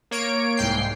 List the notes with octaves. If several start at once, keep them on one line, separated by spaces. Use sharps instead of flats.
A#3 C#5 D7
C2 G#2 G5 C7